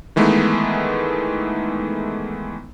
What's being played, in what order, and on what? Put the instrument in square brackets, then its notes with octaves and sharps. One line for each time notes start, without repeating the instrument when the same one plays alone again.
[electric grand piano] D#3 E3 G#3 A3 B3 D#4